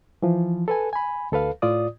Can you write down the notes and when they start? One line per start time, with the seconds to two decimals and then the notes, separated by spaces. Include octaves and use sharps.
0.22 E3 F3
0.68 A4 B4 G#5
0.93 G#5 B5
1.32 D2 A4 B4 F5
1.62 A2 F4 D5 D#6